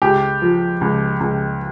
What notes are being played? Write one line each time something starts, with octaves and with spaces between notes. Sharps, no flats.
C#2 G4
F3
C#2
C#2